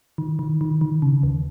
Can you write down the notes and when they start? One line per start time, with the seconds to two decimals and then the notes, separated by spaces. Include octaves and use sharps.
0.18 D#3
0.39 D#3
0.61 D#3
0.81 D#3
1.02 C#3
1.23 D#2